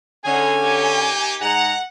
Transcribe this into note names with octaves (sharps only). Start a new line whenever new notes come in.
D3 C#4 D#4 G#4 G#5
A#3 D#4 G4
G#2 G#3 F#5 A#5